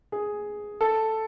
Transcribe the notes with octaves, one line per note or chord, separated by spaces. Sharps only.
G#4
A4